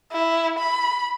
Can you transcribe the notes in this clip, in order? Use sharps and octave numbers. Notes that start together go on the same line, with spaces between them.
E4
B5